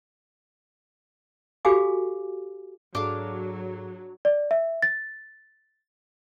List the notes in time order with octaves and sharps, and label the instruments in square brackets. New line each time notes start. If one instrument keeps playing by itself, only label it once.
[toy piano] F#4 G4 A4 F5 G#5 D6
[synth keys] G#2 G#4 A4 [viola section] F#3 [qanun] D4 F5 [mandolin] D6
[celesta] D5
E5
A6